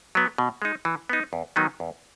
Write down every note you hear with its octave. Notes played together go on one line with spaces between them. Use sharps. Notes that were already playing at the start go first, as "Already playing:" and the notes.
F#3 B3
B2
G#3 D#4
E3
B3 D#4
E2
D#3 F#3 B3 D#4
E2